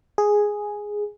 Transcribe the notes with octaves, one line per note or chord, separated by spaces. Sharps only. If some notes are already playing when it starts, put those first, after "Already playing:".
G#4